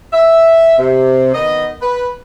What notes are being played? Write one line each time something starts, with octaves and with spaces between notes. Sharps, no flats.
E5
C3
D#3 B3 D#5
B4